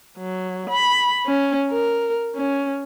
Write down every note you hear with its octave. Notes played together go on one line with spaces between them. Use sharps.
F#3
B5
C#4
A#4
C#4